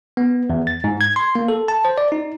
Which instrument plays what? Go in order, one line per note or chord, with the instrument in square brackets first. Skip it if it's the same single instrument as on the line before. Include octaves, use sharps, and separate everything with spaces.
[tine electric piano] B3
E2
A6
G#2
G#6
C6
A#3
A4
A5
C5
D5
D#4